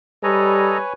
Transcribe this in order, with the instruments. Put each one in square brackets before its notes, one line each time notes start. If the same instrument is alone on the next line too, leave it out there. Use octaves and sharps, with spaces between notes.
[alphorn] G3 [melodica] A4 D#5 A#5 [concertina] B4 C#5 G#5